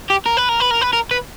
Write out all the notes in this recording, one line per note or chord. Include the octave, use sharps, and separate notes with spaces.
G4
A#4
B4
A#4
B4
A#4
B4
A#4
B4